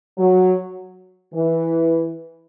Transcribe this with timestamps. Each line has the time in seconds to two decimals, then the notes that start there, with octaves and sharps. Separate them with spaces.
0.18 F#3
1.34 E3